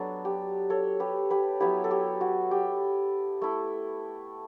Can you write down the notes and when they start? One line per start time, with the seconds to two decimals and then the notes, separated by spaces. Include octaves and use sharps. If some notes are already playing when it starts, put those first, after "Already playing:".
Already playing: F#3 B3 D4 F#4 A4
0.25 G4
0.70 A4 C#5
1.00 G4 B4
1.30 G4 B4
1.60 F#3 B3 E4 G4 B4
1.84 A4
1.91 G4
2.21 F#4
2.51 G4
3.42 A3 E4